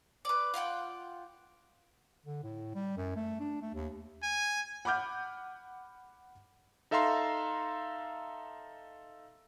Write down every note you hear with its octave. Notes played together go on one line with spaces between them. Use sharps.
B4 D5
F4 E5 F#5 G5
D3
A2
G3
F#2
A3
D4
A3
D#2
G#5
F#5 B5 D6 F6 G6
D#4 A4 E5 F5 A#5 C6